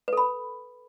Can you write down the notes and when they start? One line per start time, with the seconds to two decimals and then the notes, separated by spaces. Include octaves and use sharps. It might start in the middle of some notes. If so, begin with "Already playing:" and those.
0.08 B4
0.13 A4
0.17 B5